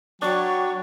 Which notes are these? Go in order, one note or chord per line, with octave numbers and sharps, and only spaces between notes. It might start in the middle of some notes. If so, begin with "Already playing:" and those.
F#3 D4 F#5 G5 C#6